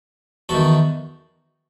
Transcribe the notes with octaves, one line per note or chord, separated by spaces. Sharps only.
E2 D#3 F#4 A4